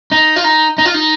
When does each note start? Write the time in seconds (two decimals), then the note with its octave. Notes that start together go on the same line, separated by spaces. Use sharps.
0.12 D#4
0.36 F4
0.44 D#4
0.78 D#4
0.85 F4
0.94 D#4